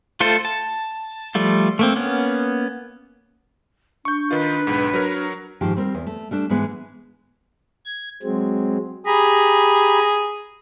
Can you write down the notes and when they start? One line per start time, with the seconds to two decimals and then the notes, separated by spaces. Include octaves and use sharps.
0.20 A3 F4 A4 C5
0.45 A5
1.35 F3 G3 A3 F4
1.79 A3 A#3 C4
1.96 A#3 B3 C#4
4.05 D4 C#6 G6
4.31 D#3 D#4 F4 B4
4.67 B1 G#2
4.94 F#3 A#4 C#5
5.61 G#2 D#3 F3 G4
5.77 G3 C4 A#4
5.94 E2
6.07 A3
6.31 G3 A3 D4
6.49 G#2 E3 G#3 B3
7.85 G#6
8.23 F#3 G#3 C4
9.06 G4 G#4 A#5 B5